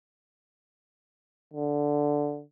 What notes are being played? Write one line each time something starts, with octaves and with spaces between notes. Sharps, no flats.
D3